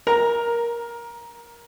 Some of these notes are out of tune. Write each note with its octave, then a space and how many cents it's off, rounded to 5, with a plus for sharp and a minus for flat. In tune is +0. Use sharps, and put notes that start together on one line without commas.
A#4 +15 A#5 +0